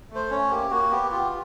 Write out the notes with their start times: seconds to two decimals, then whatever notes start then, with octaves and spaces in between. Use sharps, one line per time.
0.10 A3
0.15 C5
0.31 C#4 C#5
0.51 A#3 G4
0.71 A#3 F#4
0.91 B3 G4
1.11 F4 G4